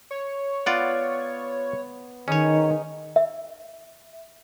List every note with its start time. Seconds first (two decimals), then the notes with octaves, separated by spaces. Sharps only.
0.11 C#5
0.66 B3 F4 D5 F#5
2.28 D#3 C#4 D#4 G#4 C#5 D#5
3.16 E5